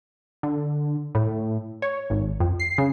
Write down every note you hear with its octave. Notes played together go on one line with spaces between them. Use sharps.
D3
A2
C#5
G#1
F2
C7
C#3